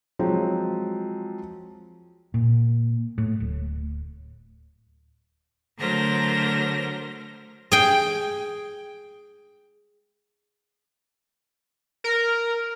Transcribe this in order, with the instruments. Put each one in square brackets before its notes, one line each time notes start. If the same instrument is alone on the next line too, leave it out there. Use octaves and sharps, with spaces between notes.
[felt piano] F3 F#3 G#3 C4
[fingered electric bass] A#2
A2
D1
[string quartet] D3 F#3 A3 A#4 C5 A#6
[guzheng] G#4 G5
[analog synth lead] A#4